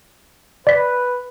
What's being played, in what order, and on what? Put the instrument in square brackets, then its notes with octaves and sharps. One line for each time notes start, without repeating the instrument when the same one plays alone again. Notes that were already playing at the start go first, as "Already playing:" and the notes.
[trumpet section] B4 [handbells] D5 B6